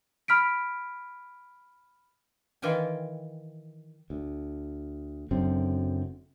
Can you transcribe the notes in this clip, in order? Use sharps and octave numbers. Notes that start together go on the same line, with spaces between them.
B5 F6 B6 D7
D#3 E3 F4 G5 G#5
D2
F#1 F#2 D3 C4